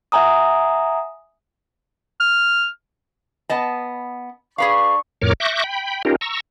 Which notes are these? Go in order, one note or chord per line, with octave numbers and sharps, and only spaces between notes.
E5 F#5 G#5 A#5 D#6
F6
B3 D#5 A5
D4 G#4 B4 F5 C#6
F2 A2 A#4 C#5 D6 F6
E5 C#6 D6 F#6 G6 A#6
G5 B5
C#4 D#4 F4 G4 A#4
A#5 C#6 E6